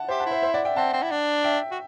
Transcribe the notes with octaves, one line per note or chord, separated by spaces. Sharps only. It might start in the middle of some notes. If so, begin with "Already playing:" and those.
Already playing: F#5 A5
G4 C5 E5
F#5 A5
E4
C5 E5
C5 E5
D5 F#5
E5 G5
C4 F#5 A5
C4
E4
D4
E5 G5
F#4